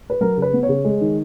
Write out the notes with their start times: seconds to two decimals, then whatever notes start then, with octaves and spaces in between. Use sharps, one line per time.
0.10 B4
0.21 F#3 A#4
0.37 C#3 B4
0.53 B3
0.63 C#5
0.69 C#3
0.85 G#3
1.01 D#3